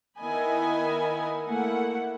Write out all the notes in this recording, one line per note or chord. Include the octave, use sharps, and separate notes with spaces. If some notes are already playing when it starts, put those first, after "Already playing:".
D#3 B3 E4 D#5 G#5 B5
A3 A#3 E4 F#5